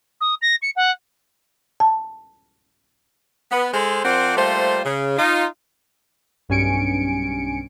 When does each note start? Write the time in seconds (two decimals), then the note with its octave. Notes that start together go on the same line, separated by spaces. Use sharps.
0.21 D#6
0.42 A#6
0.62 C#7
0.76 F#5
1.80 A5
3.51 B3
3.73 G#3 A4 C5
4.05 F3 C4 A#4 C5 D5 F#5
4.37 G3 A3 A#3 F4 C5
4.85 C#3
5.18 D#4 F4
6.49 B1 G2 C#4 G#5 C#7 D7